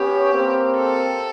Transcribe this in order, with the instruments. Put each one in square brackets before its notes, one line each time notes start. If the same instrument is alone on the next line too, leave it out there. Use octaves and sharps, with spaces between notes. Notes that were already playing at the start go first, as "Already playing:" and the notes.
Already playing: [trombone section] B3 C#4 [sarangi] G4
[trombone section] A#3 C4
[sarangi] A4